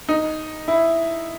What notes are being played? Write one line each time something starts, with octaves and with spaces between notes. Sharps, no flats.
D#4
E4